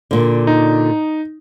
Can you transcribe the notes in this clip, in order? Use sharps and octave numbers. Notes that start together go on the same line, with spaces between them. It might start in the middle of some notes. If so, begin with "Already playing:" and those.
A#2 D3
D#4